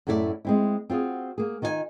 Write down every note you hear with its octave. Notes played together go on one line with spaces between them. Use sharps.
F#2 A2 A3 E4 A4 D5
G#3 C4 E4
C4 F4 F#4 G#4
A#3 G#4
D#3 D#4 F4 A4 G#5